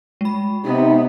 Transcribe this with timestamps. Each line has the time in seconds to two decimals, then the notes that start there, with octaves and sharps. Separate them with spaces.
0.21 G#3 B5
0.65 C3 B3 D#4